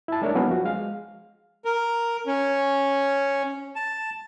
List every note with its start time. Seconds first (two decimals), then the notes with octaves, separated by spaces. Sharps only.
0.08 E4 A5
0.22 G#3 A3 D4 A#4 C#5
0.35 F#3 A#3 B3 C#4 D#4 E4
0.48 F3 F#4
0.65 G#3 F5
1.65 A#4
2.27 C#4
3.76 A5